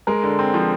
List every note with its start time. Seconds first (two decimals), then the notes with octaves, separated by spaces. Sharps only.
0.07 G#3 A#4
0.24 D3
0.39 C4
0.54 F3